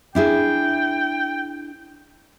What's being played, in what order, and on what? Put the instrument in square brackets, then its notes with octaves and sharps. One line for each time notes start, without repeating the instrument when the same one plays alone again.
[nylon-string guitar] D4 E4 G#4 [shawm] G5